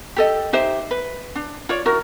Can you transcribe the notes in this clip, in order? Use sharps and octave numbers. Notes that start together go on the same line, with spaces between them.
G4 A4 D#5
D#4 G4 C5 E5
B4
D4
F4 C#5 D5
E4 F#4 A#4